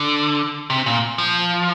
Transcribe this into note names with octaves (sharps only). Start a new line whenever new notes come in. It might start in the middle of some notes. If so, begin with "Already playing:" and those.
Already playing: D3
C3
A#2
F3